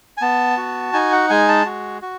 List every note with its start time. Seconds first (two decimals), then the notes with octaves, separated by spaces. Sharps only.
0.17 G#5
0.21 B3 A5
0.57 F#4
0.93 D#4 G#5
1.12 F#5
1.30 G#3 G#5
1.49 A5
1.66 F#4
2.02 F#4